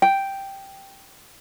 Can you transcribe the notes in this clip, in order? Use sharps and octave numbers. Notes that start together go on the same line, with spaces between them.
G5